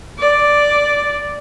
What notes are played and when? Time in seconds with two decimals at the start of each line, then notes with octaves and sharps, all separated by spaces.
0.18 D5